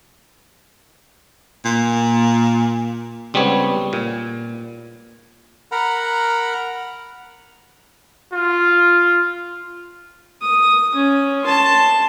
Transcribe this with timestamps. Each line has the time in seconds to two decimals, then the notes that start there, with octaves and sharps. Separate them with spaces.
1.65 A#2
3.34 C#2 G3 B3 C4 C#5
3.93 A#2
5.72 A#4 F#5 A#5 B5
8.33 F4
10.42 D#6
10.95 C#4
11.44 A5 C6